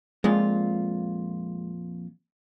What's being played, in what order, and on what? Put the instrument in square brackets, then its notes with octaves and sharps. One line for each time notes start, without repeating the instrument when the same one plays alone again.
[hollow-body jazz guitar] F2 A#2 F4 [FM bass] G#3